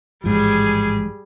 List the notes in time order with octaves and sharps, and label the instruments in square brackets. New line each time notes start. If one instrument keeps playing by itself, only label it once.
[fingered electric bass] A1 G#2 F3 [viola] G3 G#4